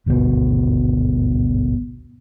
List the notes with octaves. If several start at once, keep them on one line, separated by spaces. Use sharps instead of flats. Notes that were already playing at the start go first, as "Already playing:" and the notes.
G#1 D2 G2 B2